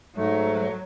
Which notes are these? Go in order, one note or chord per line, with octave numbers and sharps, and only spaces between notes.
G#2 F#3 A3